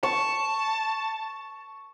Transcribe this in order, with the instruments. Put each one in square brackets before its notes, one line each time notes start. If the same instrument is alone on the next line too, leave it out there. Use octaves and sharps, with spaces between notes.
[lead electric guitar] A5 [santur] C#6